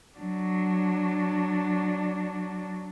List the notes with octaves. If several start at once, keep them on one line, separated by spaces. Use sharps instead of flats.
F#3 D4